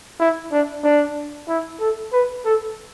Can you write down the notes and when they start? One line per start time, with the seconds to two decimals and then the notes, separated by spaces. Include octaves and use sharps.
0.20 E4
0.52 D4
0.83 D4
1.48 E4
1.80 A4
2.13 B4
2.45 A4